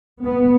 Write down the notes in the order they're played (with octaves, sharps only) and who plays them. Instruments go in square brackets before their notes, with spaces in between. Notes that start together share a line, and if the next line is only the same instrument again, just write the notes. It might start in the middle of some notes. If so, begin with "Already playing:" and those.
[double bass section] B3